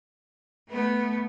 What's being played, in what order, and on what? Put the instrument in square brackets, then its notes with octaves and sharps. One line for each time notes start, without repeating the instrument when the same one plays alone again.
[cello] A3 B3